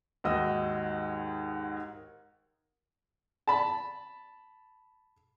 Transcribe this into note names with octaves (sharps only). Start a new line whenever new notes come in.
D#2 G#2 F#4 D#5 E6
A5 B5